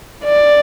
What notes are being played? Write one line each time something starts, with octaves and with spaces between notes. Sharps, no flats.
D5